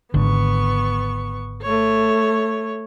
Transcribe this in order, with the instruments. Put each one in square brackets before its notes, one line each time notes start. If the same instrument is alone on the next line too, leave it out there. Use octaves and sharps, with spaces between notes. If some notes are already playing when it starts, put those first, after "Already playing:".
[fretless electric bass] G#1 D3 [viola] B3 C#6
[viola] A3 C#5